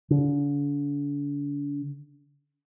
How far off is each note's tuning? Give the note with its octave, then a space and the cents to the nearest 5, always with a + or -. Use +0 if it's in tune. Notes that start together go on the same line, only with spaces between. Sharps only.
D3 -45